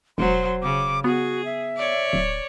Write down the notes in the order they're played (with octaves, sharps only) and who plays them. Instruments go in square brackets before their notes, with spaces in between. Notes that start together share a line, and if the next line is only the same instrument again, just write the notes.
[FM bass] E1 [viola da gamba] F#3 C5 [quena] C6
[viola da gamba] C#3 [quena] D6
[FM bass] B3 [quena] F#4 [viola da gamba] G#4
[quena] E5
[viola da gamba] C#5 D5
[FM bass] D1